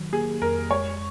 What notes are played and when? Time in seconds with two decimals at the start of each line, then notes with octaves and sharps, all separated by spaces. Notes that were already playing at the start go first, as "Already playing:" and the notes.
Already playing: D#3 F#3
0.13 A#3 G#4
0.41 F2 A#4
0.71 G#3 C#5